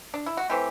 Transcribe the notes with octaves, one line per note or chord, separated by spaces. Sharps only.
D4
E4
F#4
E3 A3 C4 G4